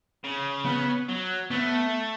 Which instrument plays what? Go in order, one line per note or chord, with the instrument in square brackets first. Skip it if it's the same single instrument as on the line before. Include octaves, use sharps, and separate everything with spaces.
[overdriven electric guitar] C#3
[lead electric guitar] B3
[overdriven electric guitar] F#3
[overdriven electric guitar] A3 [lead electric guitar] B3